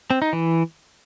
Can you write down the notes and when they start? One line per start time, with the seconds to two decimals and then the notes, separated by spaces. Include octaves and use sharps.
0.10 C4
0.22 D#4
0.33 E3